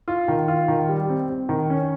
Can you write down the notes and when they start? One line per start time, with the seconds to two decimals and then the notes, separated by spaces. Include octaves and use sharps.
0.08 F4
0.28 D#3
0.48 F4
0.68 D#3
0.89 G3
1.09 C4
1.29 C4
1.49 D#3
1.70 C#4